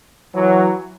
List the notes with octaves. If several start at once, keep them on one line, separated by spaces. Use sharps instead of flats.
E3 F#3